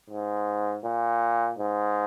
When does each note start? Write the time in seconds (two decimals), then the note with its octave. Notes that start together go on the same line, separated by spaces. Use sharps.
0.10 G#2
0.84 A#2
1.59 G#2